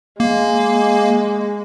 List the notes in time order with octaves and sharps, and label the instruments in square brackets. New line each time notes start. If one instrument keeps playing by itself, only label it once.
[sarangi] G#3 [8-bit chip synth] A#3